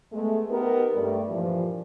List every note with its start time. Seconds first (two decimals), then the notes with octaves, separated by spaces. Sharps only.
0.12 G#3 A3 B3
0.49 B3 D#4 G4 A#4
0.94 G2 G3 A3
1.30 G2 A#2 E3 F3